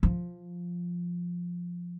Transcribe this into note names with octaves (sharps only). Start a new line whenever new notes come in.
F3